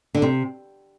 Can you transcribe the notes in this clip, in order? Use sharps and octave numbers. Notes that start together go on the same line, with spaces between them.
D3
C3